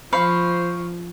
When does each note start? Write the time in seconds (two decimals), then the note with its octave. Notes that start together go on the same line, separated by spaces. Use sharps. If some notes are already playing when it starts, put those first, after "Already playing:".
0.13 F3 C5 F5 B5 C#6